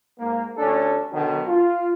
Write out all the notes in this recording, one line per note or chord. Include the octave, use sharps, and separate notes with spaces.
G#2 A#3
A1 D2 C#4 D4 A4
B2 D3 D#3 F#3
F4